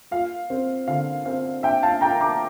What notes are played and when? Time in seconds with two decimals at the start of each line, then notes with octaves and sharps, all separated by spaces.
0.11 F4 F5
0.50 C4
0.88 D3 F5
1.26 C4 F5
1.63 D4 E5 G5
1.83 F5 A5
2.01 D4 G5 A#5
2.21 A#5 D6